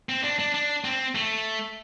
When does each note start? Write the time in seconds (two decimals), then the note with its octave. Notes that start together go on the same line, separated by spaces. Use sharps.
0.09 C4
0.24 D4
0.39 D4
0.54 D4
0.84 C4
1.15 A3